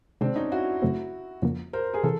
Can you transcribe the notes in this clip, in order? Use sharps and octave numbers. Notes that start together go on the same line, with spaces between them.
C3 D#3 G#3 C4 D4
C#4 D#4
E4 F#4
F#2 C#3 F#3 A3 C4
F2 C#3 F3 A#3
A#4 C5
G#4 A#4
C3 E3 A4